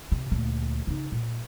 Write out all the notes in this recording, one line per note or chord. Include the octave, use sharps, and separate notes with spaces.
C3
D2 A#2
C#3 D#4
A#2